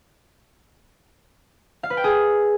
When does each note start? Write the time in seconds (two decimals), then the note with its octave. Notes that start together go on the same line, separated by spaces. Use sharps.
1.83 F5
1.90 B4
1.97 G5
2.04 G#4